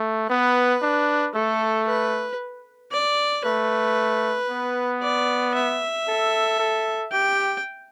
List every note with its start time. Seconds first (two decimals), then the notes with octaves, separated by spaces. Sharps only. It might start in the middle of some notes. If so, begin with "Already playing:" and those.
Already playing: A3
0.30 B3 B4
0.82 D4
1.35 A3 A4
1.87 B4
2.92 D5
3.45 A3 B4
4.50 B3
5.02 D5
5.55 E5
6.08 A4
6.59 A4
7.12 G4 G5